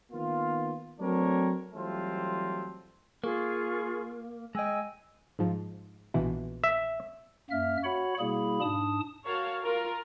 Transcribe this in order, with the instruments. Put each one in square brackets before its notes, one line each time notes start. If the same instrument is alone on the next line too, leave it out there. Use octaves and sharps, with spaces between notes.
[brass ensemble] D#3 A#3 B3 F4
F#3 A3 C4 D4 A#4 C#5
E3 F#3 G3 A3 C4 F4
[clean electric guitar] A#3 [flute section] F4 G#4 C#6
[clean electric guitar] G#3 D#5 [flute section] G5 G#5 E6
[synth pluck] G#2 F3
A#1 B2 E3
[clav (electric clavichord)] E5
[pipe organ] F#2 A#3 E5 F6
F#4 C#5 F#5 B5
B2 G3 A#3 E4 G#4 B5
G#2 D4 A5 D#6
[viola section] F#4 A#4 C#5 F5 A5
F4 A#4